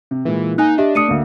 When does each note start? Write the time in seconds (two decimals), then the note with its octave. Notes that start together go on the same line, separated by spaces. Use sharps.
0.11 C3
0.25 A#2 E3 G#3
0.58 A#3 D#4 G#5 F#6
0.78 D4 G4 D#5 E5
0.95 A3 D#6 C#7 D#7
1.09 D2 A#3